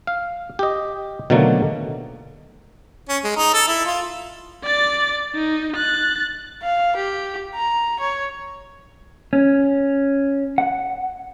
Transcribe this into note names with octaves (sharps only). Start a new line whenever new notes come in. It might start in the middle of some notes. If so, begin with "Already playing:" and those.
F5
G4 D#5
B2 D3 D#3 F#3 A3 A#3
C#4
G#3
D#4
A4
E4
F4
D5 A6
D#4
F#6 A6
F5
G4
A#5
C#5
C#4
F#5